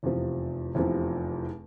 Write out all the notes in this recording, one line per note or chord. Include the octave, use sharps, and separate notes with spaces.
F1 E2 C3 F3
F1 E2 C3 F3